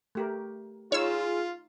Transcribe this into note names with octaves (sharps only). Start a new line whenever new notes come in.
A3 G4 A#4
D#4 F4 G#4 C#5 E6